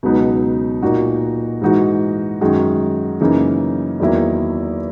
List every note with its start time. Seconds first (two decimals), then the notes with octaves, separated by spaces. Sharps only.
0.03 C#2 B2 F#3 B3 D#4
0.82 A#2 A#3 D#4 F#4
1.61 G#2 E3 G#3 D#4 F#4
2.41 F#2 D#3 G#3 D#4 F#4
3.20 F#2 C#3 E3 A#3 D#4
4.00 E2 D#3 F#3 A#3 E4